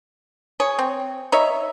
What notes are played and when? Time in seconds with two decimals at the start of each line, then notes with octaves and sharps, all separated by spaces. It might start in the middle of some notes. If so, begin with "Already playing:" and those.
0.60 G#4 C#5
0.79 C4
1.32 D#4 C#5 E5